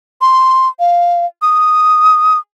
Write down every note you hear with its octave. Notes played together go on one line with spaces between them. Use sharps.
C6
F5
D#6